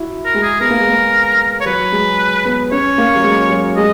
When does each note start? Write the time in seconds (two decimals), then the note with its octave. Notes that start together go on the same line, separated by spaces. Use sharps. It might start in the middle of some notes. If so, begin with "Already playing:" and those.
Already playing: E4 F#4
0.25 A#4
0.34 G#3
0.43 G#4
0.60 B3 A#4
0.71 A#3
0.80 G#3
0.89 A#3
1.61 C#5
1.66 F#3 B4
1.92 G#3
2.45 B3
2.72 C#4 C#5
2.98 A#3
3.15 F#3
3.24 G#3
3.50 F#3
3.77 G#3 D#5